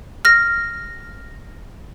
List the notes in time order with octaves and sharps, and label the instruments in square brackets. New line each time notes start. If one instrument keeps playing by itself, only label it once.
[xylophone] F6 A#6